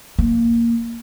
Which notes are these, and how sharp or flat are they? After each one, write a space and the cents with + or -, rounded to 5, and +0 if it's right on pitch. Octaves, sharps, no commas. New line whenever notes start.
A#3 -5